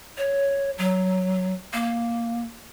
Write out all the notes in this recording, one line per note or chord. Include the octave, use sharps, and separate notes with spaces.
C#5
F#3
A#3